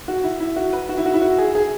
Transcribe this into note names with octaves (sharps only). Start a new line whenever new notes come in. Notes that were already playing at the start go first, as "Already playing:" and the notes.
F#4
E4
E4
F#4
B4
F#4
E4
F#4
E4
F#4
G#4
G#4